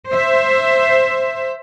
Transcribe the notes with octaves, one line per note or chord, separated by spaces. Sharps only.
C5 E5